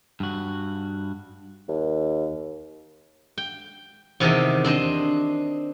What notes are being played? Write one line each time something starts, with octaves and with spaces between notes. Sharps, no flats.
G2 F#4
D#2
G5
E2 C3 D#3 G4 G#4 D#5
C4 D4 C5 D#5